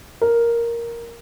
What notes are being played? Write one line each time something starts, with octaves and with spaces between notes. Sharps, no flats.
A#4